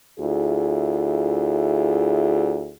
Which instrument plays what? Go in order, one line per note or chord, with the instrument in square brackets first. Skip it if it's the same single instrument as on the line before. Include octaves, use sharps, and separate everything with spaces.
[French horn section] D2 E4 F4 G#4